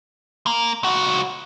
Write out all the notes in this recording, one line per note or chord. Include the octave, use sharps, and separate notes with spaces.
A#3
C#2 F#4